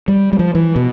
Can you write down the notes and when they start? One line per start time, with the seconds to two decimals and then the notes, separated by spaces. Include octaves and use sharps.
0.08 G3
0.33 G3
0.39 F3
0.55 E3
0.76 B2